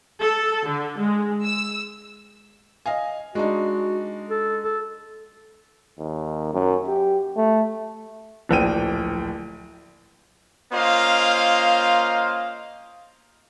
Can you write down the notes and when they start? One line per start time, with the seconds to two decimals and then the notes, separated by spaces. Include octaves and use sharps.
0.22 A4
0.68 D3
0.99 G#3
1.44 E6
2.86 D#5 F5 G#5
3.35 G#3 D4 D#4 F#4
4.30 A4
4.64 A4
5.99 D#2
6.54 F#2
6.88 G4
7.36 A3
8.49 D1 A#1 G5 D#7
10.72 A#3 C#4 F4 C5 D#5 F5